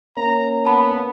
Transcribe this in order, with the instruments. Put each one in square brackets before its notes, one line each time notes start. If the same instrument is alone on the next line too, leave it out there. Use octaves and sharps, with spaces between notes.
[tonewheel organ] A#3 C#4 [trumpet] A#5
[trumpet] B3 [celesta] A5 B5